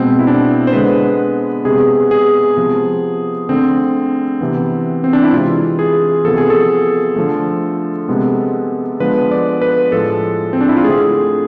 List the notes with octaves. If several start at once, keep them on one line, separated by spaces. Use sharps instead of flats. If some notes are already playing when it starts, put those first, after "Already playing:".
Already playing: B2 G#3 B3 C4
E4
D4
C5
D3 G#3 B3 B4
C3 G#3 B3 G#4
G#4
C3 F3 B3
D3 A3 C4
C3 E3 B3
C4
D4
E4
C3 E3 G#3 F4
G#4
C3 F3 B3 A4
G#4
A4
D3 F3 A3
C3 G#3 B3
D3 F3 G#3 B3 B4
D5
B4
A2 F3 G#3 A4
C4
D4
E4
F4
D3 A3 G#4